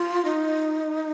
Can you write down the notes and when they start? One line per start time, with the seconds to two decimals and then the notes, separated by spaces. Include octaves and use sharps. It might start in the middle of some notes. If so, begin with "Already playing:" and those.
Already playing: F4
0.25 D#4